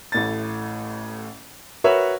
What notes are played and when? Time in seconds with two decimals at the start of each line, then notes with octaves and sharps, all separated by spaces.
0.12 A1 A2 A6
1.84 F#4 A#4 B4 C#5 E5